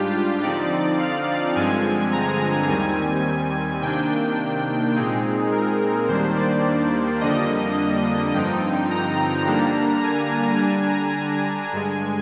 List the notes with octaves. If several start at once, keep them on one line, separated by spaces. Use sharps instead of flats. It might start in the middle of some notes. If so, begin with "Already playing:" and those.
Already playing: G#2 G3 D4 F4 G4
G4
D3 F3 C4 D#4 D5
F5
F5
G2 D3 F3 G#3 C4 G#5
A#5
D#2 D#3 G3 C4 G#5
C3 D#3 A#3 D4 G5
A#2 G#3 C4 D#4 G#4
A#4
A#4
D#2 D#3 G3 A#3 D4 C5
D5
F2 D3 G3 A#3 D4 D#5
G2 D3 F3 C4 D#4 G5
A#5
D3 G3 A#3 D4
G#5
D3 G3 D4 G#5
A#5
G#5
G2 D3 G#3